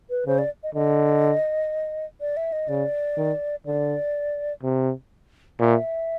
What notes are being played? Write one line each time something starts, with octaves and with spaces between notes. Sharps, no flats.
B4
C#3 C5
D5
D#5
D3 D#5
D5
E5
D#5
C#3 D5
D#3
D3 D5
C3
A#2 E5